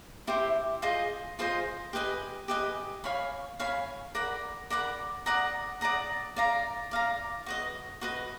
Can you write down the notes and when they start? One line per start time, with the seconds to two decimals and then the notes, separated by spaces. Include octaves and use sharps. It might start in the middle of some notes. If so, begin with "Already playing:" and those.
0.27 E4 G4 C5 E5
0.82 F4 G#4 C5 D#5
1.39 F4 G#4 C5 D#5
1.93 G4 B4 D#5 G#5
2.48 G4 B4 D#5 G#5
3.04 C#5 F5 G#5 B5
3.60 C#5 F5 G#5 B5
4.15 A#4 D5 F#5 B5
4.70 A#4 D5 F#5 B5
5.26 D5 F#5 A#5 D#6
5.81 D5 F#5 A#5 D#6
6.36 D5 F5 A#5
6.91 D5 F5 A#5
7.46 F#4 B4 D#5
8.01 F#4 B4 D#5